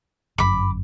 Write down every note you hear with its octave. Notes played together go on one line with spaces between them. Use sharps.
G1 F#2 B5 D6